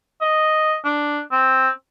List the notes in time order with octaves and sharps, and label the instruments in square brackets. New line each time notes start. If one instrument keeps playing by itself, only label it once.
[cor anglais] D#5
D4
C4